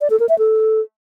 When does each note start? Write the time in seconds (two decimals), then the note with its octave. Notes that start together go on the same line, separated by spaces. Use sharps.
0.01 D5
0.10 A4
0.20 A#4
0.29 E5
0.39 A4